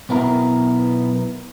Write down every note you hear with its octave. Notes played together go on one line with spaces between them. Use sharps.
B1 B3 E4 A#4